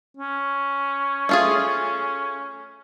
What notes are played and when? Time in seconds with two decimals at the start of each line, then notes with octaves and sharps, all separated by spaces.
0.17 C#4
1.29 A3 F4 G#4